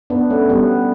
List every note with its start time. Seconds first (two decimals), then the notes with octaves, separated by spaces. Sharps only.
0.10 B3 D4
0.30 A3 C#4
0.49 G3 B3